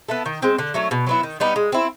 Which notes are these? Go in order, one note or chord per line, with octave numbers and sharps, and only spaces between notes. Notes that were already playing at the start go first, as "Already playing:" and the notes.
B3 E4 A4
D#3
G#3 C4
D3
F#3 A3 C#4
B2
F#3 B3 E4
D#3
G3 B3 D#4
G#3
C4 E4